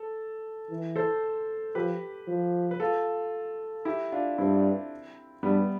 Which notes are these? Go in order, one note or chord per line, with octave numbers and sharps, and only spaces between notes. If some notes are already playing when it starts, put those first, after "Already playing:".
Already playing: A4
E3
A4 C5
F3 G4 B4
F3
B4
F4 A4
E4 G4
D4 F4
G2 C4 E4
G2 G3 B3